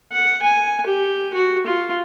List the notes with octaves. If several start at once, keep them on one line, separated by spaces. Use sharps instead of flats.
F#5
G#5
G4
F#4
F4